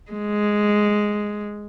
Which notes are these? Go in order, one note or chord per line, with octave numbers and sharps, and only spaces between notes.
G#3